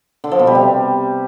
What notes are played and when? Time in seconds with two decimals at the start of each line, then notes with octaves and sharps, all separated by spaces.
0.24 D3
0.32 F3
0.39 B2
0.47 G3
0.55 C3